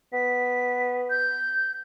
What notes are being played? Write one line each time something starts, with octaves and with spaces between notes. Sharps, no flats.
B3 B6
G6